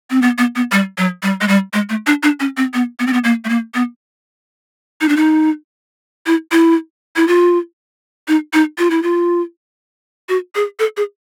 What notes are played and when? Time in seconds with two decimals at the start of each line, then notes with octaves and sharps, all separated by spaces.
0.10 C4
0.22 B3
0.38 B3
0.56 B3
0.72 G3
0.98 F#3
1.23 G3
1.41 G#3
1.48 G3
1.73 G#3
1.89 A3
2.07 D4
2.23 D4
2.40 C#4
2.57 C4
2.74 B3
3.00 B3
3.07 C4
3.13 B3
3.24 A#3
3.45 A3
3.49 A#3
3.74 B3
5.01 D#4
5.09 D4
5.17 D#4
6.26 E4
6.52 E4
7.16 E4
7.28 F4
8.28 D#4
8.54 D#4
8.78 F4
8.90 E4
9.03 F4
10.29 F#4
10.55 G#4
10.79 A4
10.97 G#4